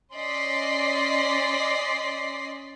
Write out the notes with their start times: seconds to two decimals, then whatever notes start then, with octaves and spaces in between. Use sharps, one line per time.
0.14 C#4 D5 D#5 C6 B6 C7